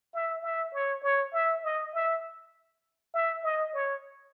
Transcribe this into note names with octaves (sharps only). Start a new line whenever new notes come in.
E5
E5
C#5
C#5
E5
D#5
E5
E5
D#5
C#5